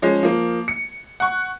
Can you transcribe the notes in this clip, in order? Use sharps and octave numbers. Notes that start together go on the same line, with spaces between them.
F3 G#3 C#4
F3 A#3
C#7
F#5 C#6